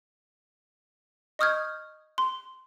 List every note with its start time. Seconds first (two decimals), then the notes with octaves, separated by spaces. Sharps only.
1.39 D#5 C#6 D#6 F6 G6 G#6
2.18 C6